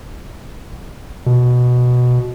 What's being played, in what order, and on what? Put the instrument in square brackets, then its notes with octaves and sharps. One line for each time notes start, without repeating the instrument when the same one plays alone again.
[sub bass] B2